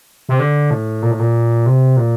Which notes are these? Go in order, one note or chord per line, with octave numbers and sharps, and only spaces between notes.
C3
D3
A2
A#2
A2
A#2
C3
A#2